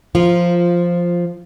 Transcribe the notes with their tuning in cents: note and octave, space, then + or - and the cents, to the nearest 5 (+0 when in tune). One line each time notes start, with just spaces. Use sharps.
F3 +0 F4 -10 A#4 +0